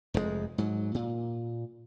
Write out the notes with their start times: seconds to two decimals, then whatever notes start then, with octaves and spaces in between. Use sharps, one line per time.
0.14 F1 F2 A#2 G#3
0.58 G#2 F#3
0.94 A#2